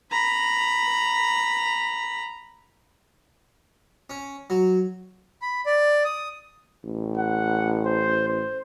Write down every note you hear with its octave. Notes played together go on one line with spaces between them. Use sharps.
A#5 B5
C#4
F#3
B5
D5
D#6
A1
F#5
C5
C5